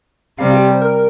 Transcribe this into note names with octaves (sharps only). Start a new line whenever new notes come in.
C3 G3 C4 F5
G4
C5
A#4